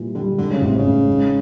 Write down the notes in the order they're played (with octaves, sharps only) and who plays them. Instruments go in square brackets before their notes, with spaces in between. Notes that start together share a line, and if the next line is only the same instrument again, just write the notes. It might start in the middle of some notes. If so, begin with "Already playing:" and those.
Already playing: [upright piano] A#2 E3 G3
[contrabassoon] D3 [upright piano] G3
[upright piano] G#2 [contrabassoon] D3
[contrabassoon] C#3
[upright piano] A1 [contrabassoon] C3
[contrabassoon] C#3
[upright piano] A1
G#2